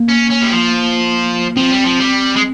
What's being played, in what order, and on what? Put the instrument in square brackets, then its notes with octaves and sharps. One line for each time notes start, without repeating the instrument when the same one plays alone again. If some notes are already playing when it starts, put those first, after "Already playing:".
Already playing: [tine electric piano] A#3
[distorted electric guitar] C#4
C#4
G3
F3
[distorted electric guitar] F3 [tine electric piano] C4
[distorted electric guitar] G3
F3
G3
G#3